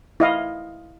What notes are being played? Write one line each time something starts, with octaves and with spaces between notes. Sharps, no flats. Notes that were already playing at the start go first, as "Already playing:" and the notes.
E4 D#5 F5